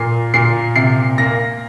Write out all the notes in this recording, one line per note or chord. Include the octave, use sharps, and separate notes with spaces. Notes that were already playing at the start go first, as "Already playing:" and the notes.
Already playing: A#2 C7
A#2 C7
C3 C7
A#3 A#6